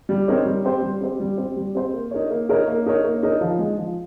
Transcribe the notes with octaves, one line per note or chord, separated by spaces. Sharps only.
G3
C4 D#4 A#4 C#5
G3
C4 G4 C5
G3
C4 G4 C5
G3
C4 G4 C5
G3
C4 G4 C5
A#3
D#4 A#4 C#5
A#3
D#4 A#4 C#5
A#3
D#4 A#4 C#5
A#3
D#4 A#4 C#5
F3
G#3 D#4
F3